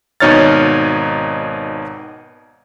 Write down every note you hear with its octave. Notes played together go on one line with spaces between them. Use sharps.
G#1 B2 D#4 C#5 F6 A6